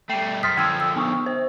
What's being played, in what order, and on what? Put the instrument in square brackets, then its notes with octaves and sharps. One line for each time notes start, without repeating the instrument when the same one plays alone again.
[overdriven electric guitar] G3 A3 [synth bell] G5 C7
[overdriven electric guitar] F#2 [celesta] C6 B6 [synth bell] D#6 F6 A6
[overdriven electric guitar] D3 F3 [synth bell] G5 [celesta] E6 G#6
[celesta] E6
[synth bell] B3 C#6 D#6
C5